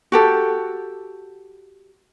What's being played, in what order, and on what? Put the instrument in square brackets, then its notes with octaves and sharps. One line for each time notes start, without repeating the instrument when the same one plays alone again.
[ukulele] F#4 G4 A4